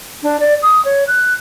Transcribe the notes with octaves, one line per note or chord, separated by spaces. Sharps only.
D4
D5
D#6
C#5
F#6